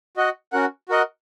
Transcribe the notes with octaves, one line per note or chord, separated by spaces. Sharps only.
F#4 D#5 F#5
C#4 F#4 A#4 F#5
F#4 A#4 D#5 F#5